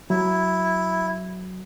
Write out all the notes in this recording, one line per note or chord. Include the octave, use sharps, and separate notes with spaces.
F#3 E4